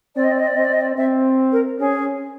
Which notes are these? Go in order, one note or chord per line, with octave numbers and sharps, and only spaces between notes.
C4 D5
D#5
D5
D#5
D5
C4 D#5
D5
D#5
D5
C4 E5
A#4
C#4 G#4